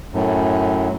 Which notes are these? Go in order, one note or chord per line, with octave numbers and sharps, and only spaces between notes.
F#2 A2